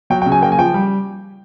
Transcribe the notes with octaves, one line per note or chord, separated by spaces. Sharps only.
F#3 G5
G5
C#3
G#5
A#3 G5
G#5
F3 G5
G3